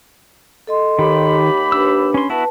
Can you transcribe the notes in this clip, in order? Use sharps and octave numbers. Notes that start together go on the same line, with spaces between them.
A4 D#5 C6
D#2 D#3 G4 B5
D4 B4 E6
C#4 C6
B3 E4 F#4 B4 A5